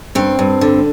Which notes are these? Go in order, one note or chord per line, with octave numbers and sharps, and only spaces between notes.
G2 C4
G2
D3